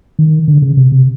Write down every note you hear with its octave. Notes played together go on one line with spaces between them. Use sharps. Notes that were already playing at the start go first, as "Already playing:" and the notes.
D#3
D3
C#3
C3
C3